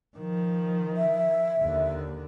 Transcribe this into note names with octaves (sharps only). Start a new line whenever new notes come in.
D#3 F3
E5
D#2 D3